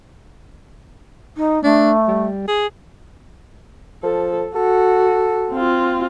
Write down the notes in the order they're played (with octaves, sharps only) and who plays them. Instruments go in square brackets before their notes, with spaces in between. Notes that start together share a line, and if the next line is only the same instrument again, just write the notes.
[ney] D#4
[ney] A3 [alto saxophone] D4
[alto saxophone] G3
G#4
[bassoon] F3 [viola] A4
[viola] F#4 [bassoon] A4
[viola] C4 F4